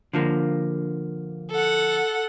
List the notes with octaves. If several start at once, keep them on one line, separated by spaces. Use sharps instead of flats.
D3 F3 A#3
A4 F#5